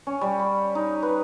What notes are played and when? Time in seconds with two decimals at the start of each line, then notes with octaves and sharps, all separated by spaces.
0.07 C#4
0.21 G3
0.39 B5
0.75 D#4
1.03 B4